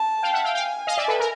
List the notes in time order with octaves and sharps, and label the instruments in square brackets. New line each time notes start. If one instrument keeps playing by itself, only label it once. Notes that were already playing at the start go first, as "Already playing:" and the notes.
Already playing: [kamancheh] A5
[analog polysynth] F5 G5
E5 F#5
F5 G5
[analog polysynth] F5 G5 [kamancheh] G#5
[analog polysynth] D#5 F5
D5 E5
A4 B4
A#4